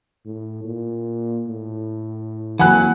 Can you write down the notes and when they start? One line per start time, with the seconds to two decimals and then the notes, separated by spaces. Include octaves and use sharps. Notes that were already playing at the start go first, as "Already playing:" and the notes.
0.25 A2
0.64 A#2
1.48 A2
2.59 F2 E3 F#3 A#3 F#5 G#5 F#6